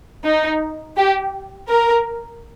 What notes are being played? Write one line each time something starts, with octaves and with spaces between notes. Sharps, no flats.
D#4
G4
A#4